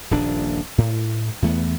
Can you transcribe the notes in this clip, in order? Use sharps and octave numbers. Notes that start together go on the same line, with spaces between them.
D#1 A#1 D4
A2
E2 E3 A3 B3